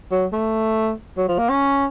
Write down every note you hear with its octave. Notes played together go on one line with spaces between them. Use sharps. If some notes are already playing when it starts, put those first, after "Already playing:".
F#3
A3
F#3
F3
A#3
C#4